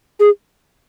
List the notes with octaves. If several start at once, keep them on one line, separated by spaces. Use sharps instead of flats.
G#4